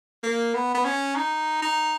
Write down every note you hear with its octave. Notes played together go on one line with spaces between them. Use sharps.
A#3
B3
B3
C#4
D#4
D#4